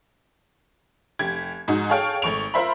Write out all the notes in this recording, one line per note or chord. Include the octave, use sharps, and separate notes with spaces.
F1 G4 G#6
G#2 D#4 F#4
G#4 A4 C#5 F5 G5
G#1 A3 C#6 D7 F7
F4 A#4 C5 E5 B5